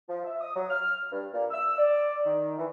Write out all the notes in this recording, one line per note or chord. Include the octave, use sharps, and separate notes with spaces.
F3
E5
D#6
F#3
F6
G2
A#2
E6
D5
D#3
E3